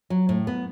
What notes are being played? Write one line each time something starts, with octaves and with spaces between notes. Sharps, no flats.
F#3
A2
B3